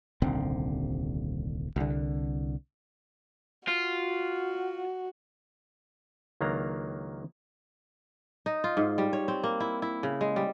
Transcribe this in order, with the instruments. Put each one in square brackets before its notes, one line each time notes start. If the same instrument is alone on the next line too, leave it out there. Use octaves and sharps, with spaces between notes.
[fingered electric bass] D#1 C2 D3 C4
C2 D3
[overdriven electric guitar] F4 [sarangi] F#4
[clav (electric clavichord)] C#2 D#3 F#3 A#3 D4 A#5
[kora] D#4
F4
G#2
G3
C#5
C4
A#3
E4
E4
C#3
G#3
G3